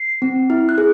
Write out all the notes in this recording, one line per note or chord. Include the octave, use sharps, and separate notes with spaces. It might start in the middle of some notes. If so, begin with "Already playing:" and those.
Already playing: C7
C4
E4
F#6
G#4